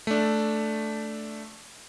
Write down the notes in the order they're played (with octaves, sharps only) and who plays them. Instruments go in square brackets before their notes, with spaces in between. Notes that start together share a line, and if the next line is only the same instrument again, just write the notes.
[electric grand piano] A3 D4